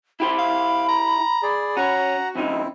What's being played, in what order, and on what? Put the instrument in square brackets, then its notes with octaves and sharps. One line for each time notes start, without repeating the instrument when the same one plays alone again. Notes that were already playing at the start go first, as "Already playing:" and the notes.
[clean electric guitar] E4 G4 C5 [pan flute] B5
[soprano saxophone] F5
A#5
[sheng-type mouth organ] G#4 D5
[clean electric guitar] C#4 [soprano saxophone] F#4 [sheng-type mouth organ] F#5 A#5
[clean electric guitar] F2 C#3 D#4 [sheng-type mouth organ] C4 E4